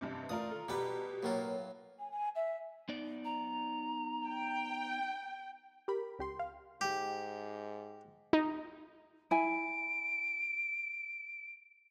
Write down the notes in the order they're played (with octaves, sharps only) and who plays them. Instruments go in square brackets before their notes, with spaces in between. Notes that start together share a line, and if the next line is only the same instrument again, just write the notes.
[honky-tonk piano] A1 G2 C3
[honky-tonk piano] E3 F4 A#4 [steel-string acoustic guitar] A3 D5 F5 [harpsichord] D#6
[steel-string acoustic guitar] D#3 A4
[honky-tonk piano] B2 G4 [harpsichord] G3 B4 [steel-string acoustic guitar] F#5 A5 A#5
[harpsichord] A2 F#3 F4 [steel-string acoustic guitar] A#3 A#4 B4
[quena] G#5
G#5
E5
[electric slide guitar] B3 D#4 D5
[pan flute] A#5
[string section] G5
[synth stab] G4 A#4 B5
C#2 G4 C6
F5
[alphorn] G#2 [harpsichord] G4
[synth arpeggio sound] D#4
[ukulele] E4 G#5 [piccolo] D7